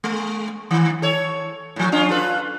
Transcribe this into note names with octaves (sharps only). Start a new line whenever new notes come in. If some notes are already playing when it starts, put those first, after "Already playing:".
G#3
D#3
A4 C#5
A2 F3
C#4 D4 F4
F4 A4 B4